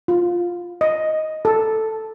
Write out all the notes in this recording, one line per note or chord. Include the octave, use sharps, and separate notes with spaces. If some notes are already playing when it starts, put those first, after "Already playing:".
F4
D#5
A4